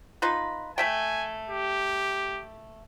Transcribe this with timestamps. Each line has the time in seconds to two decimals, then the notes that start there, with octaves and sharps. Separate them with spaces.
0.22 D#4 F4 B4
0.78 A3 E5 G5 G#5
1.50 G4